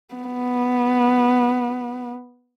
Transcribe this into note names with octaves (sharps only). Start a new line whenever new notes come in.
B3